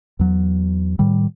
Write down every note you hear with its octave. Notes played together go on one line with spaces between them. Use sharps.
E2 F#3
A2 D#3 G3